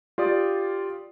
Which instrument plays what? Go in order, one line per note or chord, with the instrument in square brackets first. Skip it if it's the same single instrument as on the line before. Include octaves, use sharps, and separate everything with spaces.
[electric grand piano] F4 G4 D5 D#6